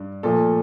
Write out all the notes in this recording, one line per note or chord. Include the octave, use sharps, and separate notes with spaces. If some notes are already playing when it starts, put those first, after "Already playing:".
Already playing: G2
A#2 F3 A3 A4